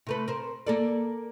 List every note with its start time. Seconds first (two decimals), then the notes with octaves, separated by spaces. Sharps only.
0.07 C3 A3 B4
0.28 A#4 C5
0.67 A#3 A4 D5